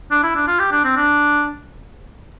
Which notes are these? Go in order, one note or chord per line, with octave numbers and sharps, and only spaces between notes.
D4
E4
D4
F4
G4
D4
C4
D4